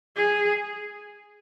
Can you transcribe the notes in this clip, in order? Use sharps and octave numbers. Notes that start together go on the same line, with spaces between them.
G#4